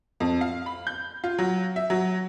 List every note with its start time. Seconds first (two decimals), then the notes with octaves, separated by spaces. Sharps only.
0.20 F2
0.41 F5
0.66 B5
0.87 G6
1.24 F4
1.39 F#3
1.76 E5
1.90 F#3